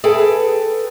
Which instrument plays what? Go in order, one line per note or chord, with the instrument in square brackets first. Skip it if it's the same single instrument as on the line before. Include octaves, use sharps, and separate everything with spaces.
[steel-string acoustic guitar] G#4 A4 B4 G5